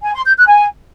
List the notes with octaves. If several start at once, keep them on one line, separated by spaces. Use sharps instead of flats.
G#5
C6
G6
F#6
G#5